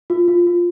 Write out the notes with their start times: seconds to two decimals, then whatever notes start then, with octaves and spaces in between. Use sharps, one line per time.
0.10 F4
0.28 F4
0.47 F4